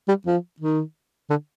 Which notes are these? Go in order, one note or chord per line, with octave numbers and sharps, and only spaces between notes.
G3
F3
D#3
D3